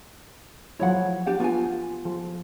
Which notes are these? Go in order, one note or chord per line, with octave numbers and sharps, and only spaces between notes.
F3 F#3 E4 C#5 F#5
D4 G4 F#5
B3 F4 G#5
F3